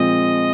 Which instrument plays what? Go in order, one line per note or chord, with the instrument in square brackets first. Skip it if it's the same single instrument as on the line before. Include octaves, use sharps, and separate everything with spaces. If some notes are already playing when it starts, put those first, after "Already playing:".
Already playing: [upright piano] A#2 F3 G#3 C4 [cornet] D#5